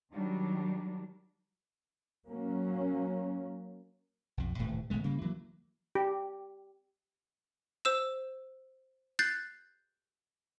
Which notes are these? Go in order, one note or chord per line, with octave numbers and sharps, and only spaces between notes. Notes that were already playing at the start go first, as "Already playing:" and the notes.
D#3 F#3 G3 D4
F#3 A#3 C#4
B1 F2
D#1 A2 C3 E3
G#1 B2 G#3 A3
C#3 G3 A#3
E3 F#3 A3 A#3
G4
C5 E6 E7
F#6 G6 A6 C7